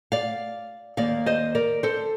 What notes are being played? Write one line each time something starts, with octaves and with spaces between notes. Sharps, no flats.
D5 F5
D#2 D#3 A#3 D5 F5
C5 D#5
A#4 D5
A4 C5